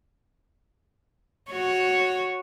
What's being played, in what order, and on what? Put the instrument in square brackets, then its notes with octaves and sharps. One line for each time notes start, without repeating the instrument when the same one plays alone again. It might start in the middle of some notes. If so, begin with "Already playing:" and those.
[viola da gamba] F#4 C#5